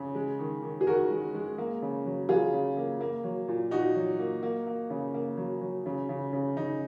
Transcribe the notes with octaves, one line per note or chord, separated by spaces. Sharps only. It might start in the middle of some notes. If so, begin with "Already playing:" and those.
Already playing: C#3
G#3
D#3
D#3
G#4
D#3 F#4 A#4
G#3
G#3
A#3
C#3
F#3
F#3 F4 G#4
C#3
A#3
A#3
F#3
A#2
A#2 D#4 F#4
F#3
A#3
A#3
A#3
C#3
A#3
F#3
F#3
C#3
C#3
C#3
C#3 D#4